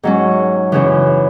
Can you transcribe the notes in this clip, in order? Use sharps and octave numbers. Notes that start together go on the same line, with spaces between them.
G#2 F#3 C#4
F#2 C#3 E3